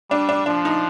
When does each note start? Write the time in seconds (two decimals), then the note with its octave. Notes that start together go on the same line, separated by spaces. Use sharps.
0.10 G3 D4
0.29 D4
0.46 F3 D4
0.65 D#4